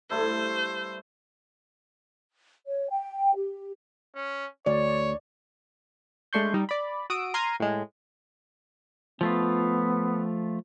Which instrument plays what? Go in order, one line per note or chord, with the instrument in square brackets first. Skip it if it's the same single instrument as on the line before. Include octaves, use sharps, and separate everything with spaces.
[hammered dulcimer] G2 A3 E4 [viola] C5
[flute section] C#5
G5
G4
[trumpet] C#4
[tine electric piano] D2 [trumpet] C#5 [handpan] D5
[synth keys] G#3 A3 D4 C6 C#6 G6
G3 D#4
D5 B5
F#4 D#6 E6 D7
A#5 C6 F6 G#6 C7 D#7
A2 G#3
[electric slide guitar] F3 A3 F4 [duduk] B3